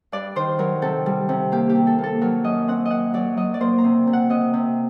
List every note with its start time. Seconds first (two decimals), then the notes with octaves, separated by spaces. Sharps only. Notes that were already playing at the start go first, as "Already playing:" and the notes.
0.12 G2 D5
0.36 D#3 C5
0.59 F#3 A#4
0.82 C3 A4
1.06 G3
1.29 C3
1.52 A#3 G4
1.69 G4
1.75 C3
1.87 A4
1.98 A#3
2.04 A4
2.21 F#3 A#4
2.44 F#2 D#5
2.68 C4 F#5
2.85 D#5
2.90 F#3 F#5
3.14 F#3 D5
3.37 F#3 D#5
3.54 D5
3.60 A#3 C5
3.78 A#5
3.84 C3
4.07 C3
4.13 F#5
4.30 C3 D#5
4.54 C3